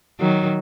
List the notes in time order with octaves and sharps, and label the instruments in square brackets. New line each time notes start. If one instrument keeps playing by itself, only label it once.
[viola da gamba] D#3 F#3